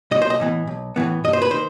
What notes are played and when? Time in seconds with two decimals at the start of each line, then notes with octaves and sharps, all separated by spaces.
0.11 B1 D#5
0.22 C5
0.30 D#5
0.40 A2 E3 B3
0.67 B1
0.96 A2 E3 B3
1.24 G2 D#5
1.33 C5
1.42 B4
1.51 D#3 C5